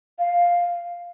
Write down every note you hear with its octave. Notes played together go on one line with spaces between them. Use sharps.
F5